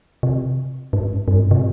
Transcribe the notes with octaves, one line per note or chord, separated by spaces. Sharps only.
C3
G#2
G2
G#2
C3